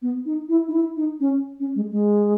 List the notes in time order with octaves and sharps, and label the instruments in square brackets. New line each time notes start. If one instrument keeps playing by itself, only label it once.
[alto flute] B3
D#4
E4
D#4
E4
D#4
C#4
C#4
G#3
G#3